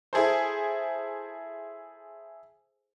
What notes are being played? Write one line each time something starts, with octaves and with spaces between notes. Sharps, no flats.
E4 G#4 A4 C5